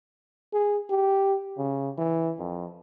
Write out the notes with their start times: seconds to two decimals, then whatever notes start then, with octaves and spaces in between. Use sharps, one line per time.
0.53 G#4
0.90 G4
1.58 C#3
1.98 E3
2.39 F2